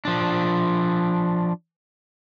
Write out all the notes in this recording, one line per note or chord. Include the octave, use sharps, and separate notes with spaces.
F3 D4